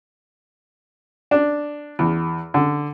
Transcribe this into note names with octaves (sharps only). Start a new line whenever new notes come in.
D4
E2
D3